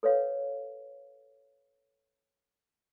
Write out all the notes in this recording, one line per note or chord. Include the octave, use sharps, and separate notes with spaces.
A4 B4 C#5 F5